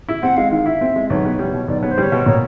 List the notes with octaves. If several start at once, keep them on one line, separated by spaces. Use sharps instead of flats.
E4
C4 F#5
G#3 F5
D#3 F5
E4 E5
C4
G#3
B1 C#5
B3
G3
B2
B1 D5
B3 C#5
C5
G3 C#5
B2
A#2 C#5